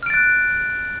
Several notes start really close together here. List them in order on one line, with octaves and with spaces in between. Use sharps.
F6 D7 A6 F#6